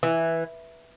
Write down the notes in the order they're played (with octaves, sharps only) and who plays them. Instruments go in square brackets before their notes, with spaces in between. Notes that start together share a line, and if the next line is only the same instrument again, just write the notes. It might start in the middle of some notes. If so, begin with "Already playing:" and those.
[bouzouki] E3